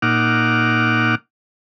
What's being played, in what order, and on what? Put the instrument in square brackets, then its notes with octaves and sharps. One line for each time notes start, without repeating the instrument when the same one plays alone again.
[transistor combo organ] A#2 D#4 F#5 D6 F6